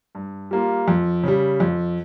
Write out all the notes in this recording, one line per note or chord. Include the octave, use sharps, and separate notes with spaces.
G2
G3 A#3 F4
F2
C#3 G3
F2